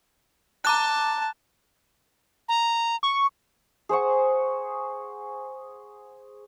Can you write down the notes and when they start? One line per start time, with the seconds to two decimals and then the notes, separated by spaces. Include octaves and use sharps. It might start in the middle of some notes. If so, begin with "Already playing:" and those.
0.65 A5 A#5 D6 F#6
2.48 A#5
3.03 C#6
3.89 G#4 C5 F#5 C#6